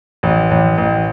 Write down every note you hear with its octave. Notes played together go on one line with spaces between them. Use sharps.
A1
A1
A1